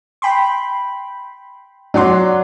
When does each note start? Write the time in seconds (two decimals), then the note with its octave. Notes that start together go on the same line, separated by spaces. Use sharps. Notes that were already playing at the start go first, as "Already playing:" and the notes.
0.22 G5 B5 C6
1.94 F#3 D5 F#5 C6